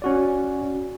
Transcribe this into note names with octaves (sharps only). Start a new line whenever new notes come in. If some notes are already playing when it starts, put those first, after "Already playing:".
C#4 F#4 D5